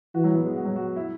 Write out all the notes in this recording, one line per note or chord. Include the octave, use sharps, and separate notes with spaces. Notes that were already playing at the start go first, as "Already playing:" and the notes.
E3 F#4
F#3
B3
G#3
F#4
F#3
F#4
E4